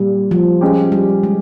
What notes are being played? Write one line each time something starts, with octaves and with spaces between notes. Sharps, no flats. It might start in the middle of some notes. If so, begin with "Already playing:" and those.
Already playing: A#2 G3
F3
G#3 C#4 G4
G3
G#3